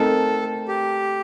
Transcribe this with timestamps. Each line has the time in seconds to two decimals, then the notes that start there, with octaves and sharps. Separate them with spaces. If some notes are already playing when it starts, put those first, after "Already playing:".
Already playing: A3 C4 D#4 A4 A#4
0.68 G4